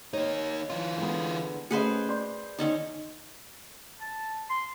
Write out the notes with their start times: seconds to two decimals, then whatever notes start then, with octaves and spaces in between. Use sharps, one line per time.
0.13 A#3 D#4 C#5
0.70 E3 F4
0.98 D3 G#3 B3
1.71 A3 C#4 G#4 B4 C5 D#5
2.08 D5 C6 G6
2.59 D#3 C#4 D#4
4.01 A5
4.50 C6